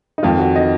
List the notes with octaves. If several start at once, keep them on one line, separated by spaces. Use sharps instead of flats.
D#4
F2 D#3 F4
F#4
D#3 D#5